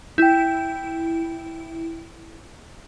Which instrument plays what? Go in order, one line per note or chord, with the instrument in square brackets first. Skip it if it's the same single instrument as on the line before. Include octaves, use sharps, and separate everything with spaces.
[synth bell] E4 [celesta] G5 G6